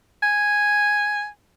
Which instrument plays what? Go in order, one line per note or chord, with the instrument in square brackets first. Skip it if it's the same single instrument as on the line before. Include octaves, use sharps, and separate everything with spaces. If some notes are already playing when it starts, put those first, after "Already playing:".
[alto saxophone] G#5